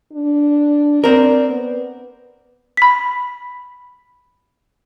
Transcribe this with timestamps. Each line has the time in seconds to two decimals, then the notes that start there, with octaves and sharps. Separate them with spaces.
0.12 D4
1.04 C4 A#4 D5
1.50 B3
2.77 B5 B6